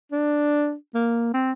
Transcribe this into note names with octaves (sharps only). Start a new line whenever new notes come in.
D4
A#3
C4